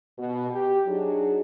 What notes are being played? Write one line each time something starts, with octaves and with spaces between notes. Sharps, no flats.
B2
G4
F#3 D4 D#4 F#4 G#4